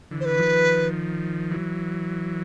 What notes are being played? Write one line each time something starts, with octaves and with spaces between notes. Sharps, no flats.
D3 E3
C5
B4
D#3 F3
E3 F#3